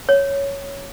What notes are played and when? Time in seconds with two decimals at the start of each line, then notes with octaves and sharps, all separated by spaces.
0.09 C#5